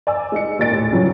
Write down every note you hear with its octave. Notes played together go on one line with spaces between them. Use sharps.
D5 G#5 E6
G#3 D#4 C#7
D#2 A#2 D5 A6 D7
A2
C#3 E3 F#3 G3 C#4